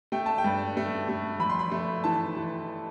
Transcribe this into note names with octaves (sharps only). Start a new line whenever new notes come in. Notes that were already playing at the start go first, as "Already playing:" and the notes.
A3 G5
A5
G5
G2
A3
A3
F2 B5
C6
B5
A3
E3 A5
E3